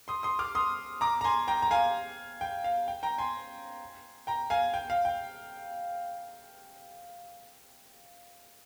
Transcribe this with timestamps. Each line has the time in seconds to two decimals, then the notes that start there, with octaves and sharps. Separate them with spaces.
0.08 C6 D#6
0.23 C6 D#6
0.39 D6 F6
0.55 C6 D#6
1.01 A#5 D6
1.21 A#5
1.24 G#5 C6
1.48 G5 A#5
1.62 A#5
1.71 F5 G#5
2.41 G5
2.64 F5
2.88 G5
3.03 G5 A#5
3.18 G#5 C6
4.27 G5 A#5
4.50 F5 G#5
4.74 G5
4.90 F5
5.05 G5